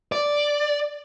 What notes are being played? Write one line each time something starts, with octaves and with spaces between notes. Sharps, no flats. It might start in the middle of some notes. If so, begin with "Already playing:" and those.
D5